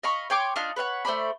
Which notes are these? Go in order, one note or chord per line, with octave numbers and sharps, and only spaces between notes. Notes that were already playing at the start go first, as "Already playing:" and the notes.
D#5 F5 B5 C#6
C#5 G5 C6 D6
D4 D#4 F4 F6
B4 C#5 F5 F#5
A3 C5 D5 B5